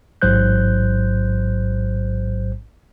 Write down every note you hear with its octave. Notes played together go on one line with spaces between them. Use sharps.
A1 G#2 F#3 C5 F#6 G6